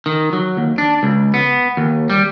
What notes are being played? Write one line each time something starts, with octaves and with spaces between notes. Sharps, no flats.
D#3
F#3
D#2
D4
C#2
B3
D#2
G3